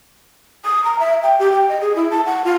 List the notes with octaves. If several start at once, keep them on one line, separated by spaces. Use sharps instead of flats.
D#6
A#5
E5
G5
G4
G5
D#5
G#4
E4
A5
F#5
F4